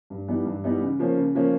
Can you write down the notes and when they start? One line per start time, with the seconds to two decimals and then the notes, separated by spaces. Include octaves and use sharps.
0.10 G2
0.28 E3 G3 B3 D#4
0.46 G2
0.64 E3 G3 B3 D#4
0.82 C#3
0.99 F3 A#3 C#4
1.17 C#3
1.35 F3 A#3 C#4